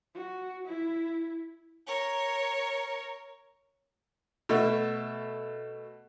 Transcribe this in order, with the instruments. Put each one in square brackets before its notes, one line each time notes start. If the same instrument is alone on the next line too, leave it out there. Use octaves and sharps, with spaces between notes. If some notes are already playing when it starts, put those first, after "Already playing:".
[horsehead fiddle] F#4
E4
[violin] A#4 C#5
[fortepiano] B2 A3